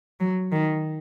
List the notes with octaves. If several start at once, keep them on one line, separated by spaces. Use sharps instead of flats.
F#3
D#3